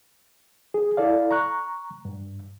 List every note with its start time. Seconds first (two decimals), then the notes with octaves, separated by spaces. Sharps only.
0.74 G#4
0.97 E4 A4 D5 F5
1.31 A#5 C#6 F#6
2.05 G2